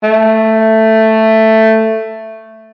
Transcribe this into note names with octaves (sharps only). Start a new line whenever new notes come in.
A3